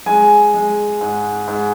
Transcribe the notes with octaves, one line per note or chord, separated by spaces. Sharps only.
G#3 G#5
G#3
G#2
G#2